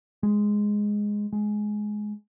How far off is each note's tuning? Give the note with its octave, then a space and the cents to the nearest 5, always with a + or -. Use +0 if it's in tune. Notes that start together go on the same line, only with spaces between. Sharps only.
G#3 -5
G#3 +15